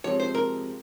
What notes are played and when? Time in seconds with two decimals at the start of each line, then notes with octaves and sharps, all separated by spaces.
0.04 C3 F3 G#3 C4 C#5
0.20 C5
0.35 A#4